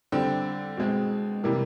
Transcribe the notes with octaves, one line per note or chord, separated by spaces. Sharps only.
D3 G3 C4
B2 G#3 C4
C3 E3 G3 A#3